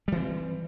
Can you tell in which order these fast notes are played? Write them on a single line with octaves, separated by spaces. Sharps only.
G3 E3 C4